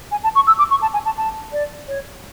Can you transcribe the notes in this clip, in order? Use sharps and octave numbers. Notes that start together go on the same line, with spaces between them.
G#5
A5
C#6
E6
D6
C#6
A5
G#5
A5
A5
D5
C#5